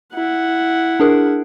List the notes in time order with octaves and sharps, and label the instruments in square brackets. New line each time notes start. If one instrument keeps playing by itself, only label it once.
[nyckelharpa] E4 F#5
[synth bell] D4 G#4 A#4